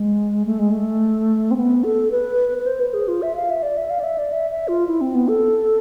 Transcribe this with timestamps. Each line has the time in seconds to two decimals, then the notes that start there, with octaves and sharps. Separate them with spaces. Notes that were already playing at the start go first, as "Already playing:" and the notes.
Already playing: G#3
0.46 A3
0.59 G#3
0.71 A3
1.51 C4
1.57 B3
1.84 A4
2.11 B4
2.58 B4
2.66 C5
2.80 B4
2.94 G#4
3.08 F4
3.22 E5
3.36 F5
3.50 E5
3.63 D5
3.77 E5
3.90 F5
3.99 D5
4.04 E5
4.18 D5
4.32 E5
4.51 E5
4.68 F4
4.87 E4
5.01 C4
5.15 B3
5.28 A4